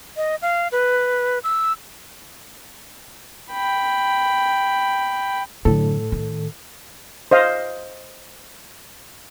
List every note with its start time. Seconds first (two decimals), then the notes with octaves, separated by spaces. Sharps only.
0.17 D#5
0.42 F5
0.72 B4
1.44 E6
3.51 G5 B5
5.65 F#2 A2 D3 A4
6.12 D#3
7.31 C5 D#5 F5